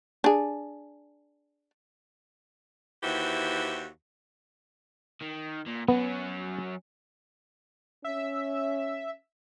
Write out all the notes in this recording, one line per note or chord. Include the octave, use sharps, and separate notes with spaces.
D4 G#4
D#2 E3 F#4 G4 C5 E5
D#3
A#2
F#3 B3 C#4
C#4 E5